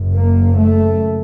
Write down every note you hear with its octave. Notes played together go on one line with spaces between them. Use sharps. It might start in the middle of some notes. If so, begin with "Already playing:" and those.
Already playing: F#1 F#2
A#3
A3